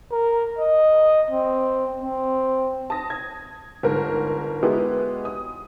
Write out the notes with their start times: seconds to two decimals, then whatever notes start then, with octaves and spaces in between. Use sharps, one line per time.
0.12 A#4
0.59 D#5
1.31 C4
2.02 C4
2.90 A5 D#6 A#6
3.10 G#6
3.83 G1 G#2 A#4
4.63 G#3 B3 E4 F#4 G4
5.25 D#6